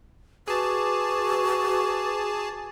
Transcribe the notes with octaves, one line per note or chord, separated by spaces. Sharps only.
F#4 G#4 B4 A5 D6